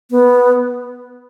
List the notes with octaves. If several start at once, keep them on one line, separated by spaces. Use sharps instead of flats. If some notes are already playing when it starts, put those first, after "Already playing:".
B3